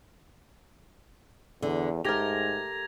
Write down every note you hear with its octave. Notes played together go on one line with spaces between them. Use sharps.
E2 D3
G#2 A3 G4 A#4 G#6 A#6 F7